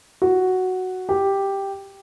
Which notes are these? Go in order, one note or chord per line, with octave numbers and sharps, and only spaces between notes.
F#4
G4